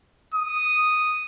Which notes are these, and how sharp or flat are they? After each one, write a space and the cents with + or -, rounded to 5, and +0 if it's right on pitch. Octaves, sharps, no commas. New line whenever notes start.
D#6 -5